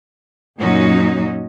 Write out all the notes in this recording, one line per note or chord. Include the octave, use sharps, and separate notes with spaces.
F#2 A#2 F#3 C#4 D#4 F#4